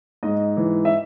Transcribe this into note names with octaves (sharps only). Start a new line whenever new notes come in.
G#2 D#5
E3
E5